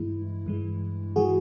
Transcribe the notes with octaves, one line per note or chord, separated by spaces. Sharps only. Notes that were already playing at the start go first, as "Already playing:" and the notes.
Already playing: G2 E3 G#3 E4
G2 E3 G#3
E3 G#3 F#4 G#4